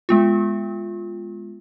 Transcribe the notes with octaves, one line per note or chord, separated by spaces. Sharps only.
G#3 B3 F4